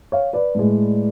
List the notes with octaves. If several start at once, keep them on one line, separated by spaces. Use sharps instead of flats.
C#5 F5
B4 D5
A2 G#3